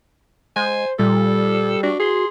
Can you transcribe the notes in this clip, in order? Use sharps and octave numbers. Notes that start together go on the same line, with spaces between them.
G#3 C5 G#5
A#2 G3 A4
D4 F#4
G#4 C6